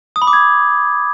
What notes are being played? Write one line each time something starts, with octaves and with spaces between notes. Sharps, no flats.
D#6
B5
D6
G#6